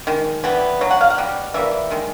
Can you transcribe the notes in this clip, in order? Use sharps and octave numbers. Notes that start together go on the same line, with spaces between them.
D#3 G#3
E3 G3 B3
B2 F#3
F#5
F5
F#5
B2 G3
E3 G3 A#3 E5
D#3 G#3